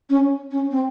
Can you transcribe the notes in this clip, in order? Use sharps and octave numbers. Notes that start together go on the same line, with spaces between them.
C#4
C#4
C4